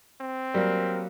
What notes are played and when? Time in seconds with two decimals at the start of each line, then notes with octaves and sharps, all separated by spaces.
0.21 C4
0.54 F#3 G3 A#3 A#4